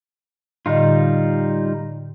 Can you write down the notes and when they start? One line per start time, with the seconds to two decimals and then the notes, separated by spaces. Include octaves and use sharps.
0.66 A2 D3 G3 D#4 F4 D#5